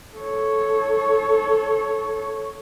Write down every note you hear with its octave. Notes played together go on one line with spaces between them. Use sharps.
A4 C#5